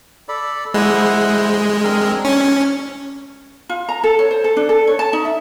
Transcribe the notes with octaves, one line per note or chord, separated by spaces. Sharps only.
A4 D5 B5
G#3 E4 C5 F#5
C4 D4 A#4
C#4 D4
F4
A#5
A4
C#5
C5
A4
D4
A4
C#5
A5
D#4
E5